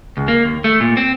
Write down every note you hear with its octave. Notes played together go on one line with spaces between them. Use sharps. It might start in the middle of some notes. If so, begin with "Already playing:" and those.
C#2
A#3
D#2
A3
A#2
C4